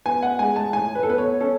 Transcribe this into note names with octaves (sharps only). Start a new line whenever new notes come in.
B3 G#5
F#5
G#3 G#5
A5
A2 G#5
B4
A4
B3 B4
C#5
C#4 A4